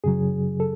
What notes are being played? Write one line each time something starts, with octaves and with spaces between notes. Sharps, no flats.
F#2 C#3 F#3 G#4
A4